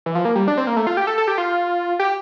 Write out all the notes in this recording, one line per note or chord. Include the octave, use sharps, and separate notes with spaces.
E3
F3
A#3
G3
D4
C4
A#3
A3
F4
G4
A4
A4
G4
F4
G4